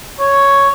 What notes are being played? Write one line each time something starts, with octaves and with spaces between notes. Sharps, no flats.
C#5